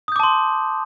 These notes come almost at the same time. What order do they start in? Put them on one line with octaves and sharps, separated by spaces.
D#6 G6 D6 A5 C6